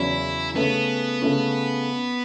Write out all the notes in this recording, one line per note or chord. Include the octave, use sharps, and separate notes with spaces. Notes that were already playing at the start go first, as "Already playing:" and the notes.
Already playing: E2 C#3 F#3 C#4 E4
C#3 A3 B3 C#4
C#3 A3 C#4